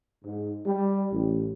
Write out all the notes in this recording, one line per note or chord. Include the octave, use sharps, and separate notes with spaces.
G#2
G3
A1